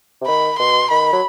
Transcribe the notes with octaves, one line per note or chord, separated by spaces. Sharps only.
C3
D#3 B5
B2 C6
D#3 B5
F#3